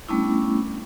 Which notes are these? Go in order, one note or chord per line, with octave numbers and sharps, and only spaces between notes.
G3 A3 B3 C#4 D4 E4